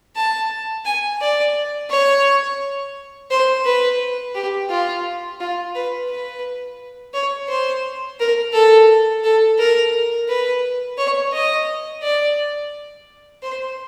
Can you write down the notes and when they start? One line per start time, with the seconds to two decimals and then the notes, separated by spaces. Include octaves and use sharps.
0.16 A5
0.85 G#5
1.21 D5
1.90 C#5
3.31 C5
3.65 B4
4.35 G4
4.69 F4
5.40 F4
5.75 B4
6.09 B4
7.14 C#5
7.49 C5
8.19 A#4
8.53 A4
9.24 A4
9.59 A#4
10.28 B4
10.98 C#5
11.33 D#5
12.03 D5
13.42 C5